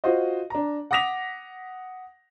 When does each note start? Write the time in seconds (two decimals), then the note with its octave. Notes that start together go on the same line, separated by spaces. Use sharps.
0.04 F4 F#4 C5 D#5
0.50 D4 A#5
0.91 F#5 D6 D#6 A#6 B6 F7